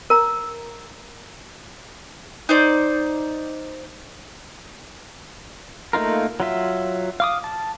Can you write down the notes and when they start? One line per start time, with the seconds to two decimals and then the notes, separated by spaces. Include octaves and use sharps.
0.10 A#4 A#5
2.49 D#4 C5 D5
5.93 A3 A#3 D#4 F4 A#4
6.40 F#3 F4 E5
7.20 F5 D6 D#6
7.44 A5